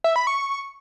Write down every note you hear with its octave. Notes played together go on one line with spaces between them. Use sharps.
E5
B5
C#6